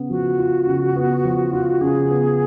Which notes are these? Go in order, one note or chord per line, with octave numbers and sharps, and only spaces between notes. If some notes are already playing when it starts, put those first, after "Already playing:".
Already playing: C#3 B3
F3 F#4
F4
C#3
B3
F3
F4
C#3 G#4
B3